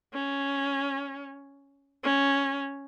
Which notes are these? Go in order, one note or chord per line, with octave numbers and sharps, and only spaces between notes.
C#4
C#4